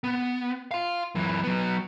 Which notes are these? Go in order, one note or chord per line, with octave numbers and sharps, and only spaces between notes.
B3
F5 C6
F#2 E3
F#3 B3